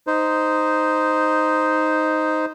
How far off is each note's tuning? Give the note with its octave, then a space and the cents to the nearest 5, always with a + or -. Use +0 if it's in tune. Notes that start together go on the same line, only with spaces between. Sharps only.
D#4 +0 C5 -10